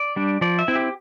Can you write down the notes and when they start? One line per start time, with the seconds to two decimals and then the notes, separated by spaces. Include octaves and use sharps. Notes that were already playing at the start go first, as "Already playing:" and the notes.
Already playing: D5
0.16 G3 D4
0.41 F3 D5
0.59 E5
0.68 C4 E4
0.75 G4